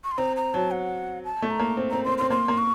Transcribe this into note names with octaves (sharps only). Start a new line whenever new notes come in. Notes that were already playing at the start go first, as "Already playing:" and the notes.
C#6
C6
C4 A#5
A#5
F#3 A5
F#5
A5
A3
A#5
A#3
C4
C4 A#5
C4 C6
C4 C6
A#3 C6
A#3
C#6